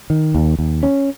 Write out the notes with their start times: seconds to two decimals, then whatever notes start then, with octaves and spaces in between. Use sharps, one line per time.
0.10 D#3
0.35 D#2
0.59 D#2
0.83 C#4